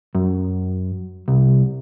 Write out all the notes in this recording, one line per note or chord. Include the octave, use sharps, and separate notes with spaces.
F#2
C2